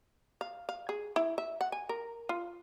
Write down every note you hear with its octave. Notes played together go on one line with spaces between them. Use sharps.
F5
F5
G#4
E4
E5
F#5
G#5
A#4
F4